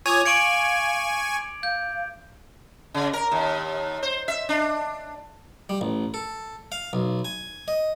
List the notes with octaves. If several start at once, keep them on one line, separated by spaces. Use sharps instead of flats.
F4 C#5 G#5 D6 D#6 G#6 F7
F5 G#5 C#6 C#7 D7 F#7
F5 G6
C#3
A#4
D#2
C5
E5
D4
G3
A1
A4
F5
B1
G#5
D#5